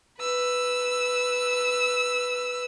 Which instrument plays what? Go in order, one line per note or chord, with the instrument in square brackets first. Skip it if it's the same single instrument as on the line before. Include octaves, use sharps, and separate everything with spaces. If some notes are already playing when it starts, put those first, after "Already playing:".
[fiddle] B4 E6